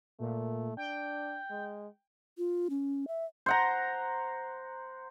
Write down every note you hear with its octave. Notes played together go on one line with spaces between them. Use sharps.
A#2 A3
D4 G5
G#3
F4
C#4
E5
C5 F#5 A#5